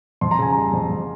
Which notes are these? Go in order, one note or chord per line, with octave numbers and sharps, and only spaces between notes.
F2 C6
A#5
C#3 G#5
G3 A#5
F2
F2